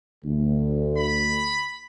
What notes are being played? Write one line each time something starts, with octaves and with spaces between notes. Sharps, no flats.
D2
B5